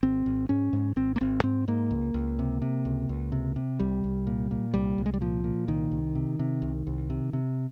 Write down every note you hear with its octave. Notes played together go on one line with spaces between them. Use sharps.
G#1 C4
G#1
G#2 C#4
G#2
G#1 C4
A#3
G#1 C4
G#2 C4
G#2 A#3
C#2
C#2
C3
C3
C#2
C#2
C3
C3
C2 G3
C2
A#2
A#2
C2 G3
C2
G#3
G3
A#2 F3
A#2
C2 D#3
C2
C3
C3
C2
C2
C3
C3